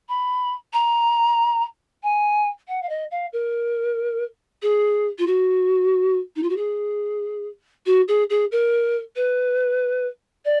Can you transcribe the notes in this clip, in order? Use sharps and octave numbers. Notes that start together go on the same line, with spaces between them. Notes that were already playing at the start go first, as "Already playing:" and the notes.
B5
A#5
G#5
F#5
F5
D#5
F5
A#4
G#4
F4
F#4
D#4
F4
F#4
G#4
F#4
G#4
G#4
A#4
B4
D5